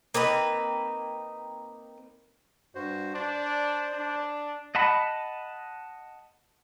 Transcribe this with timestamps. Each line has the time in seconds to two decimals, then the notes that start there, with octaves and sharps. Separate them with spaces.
0.14 A#3 C4 D#4 B4
2.75 G2 F#4 C5
3.15 D4 C5 D5
3.93 D4
4.75 D#5 F#5 A5 B5